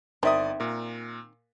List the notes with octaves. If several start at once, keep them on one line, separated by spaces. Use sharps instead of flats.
G1 D#3 C4 D5 E5 A#5 D#6
A#2 A#4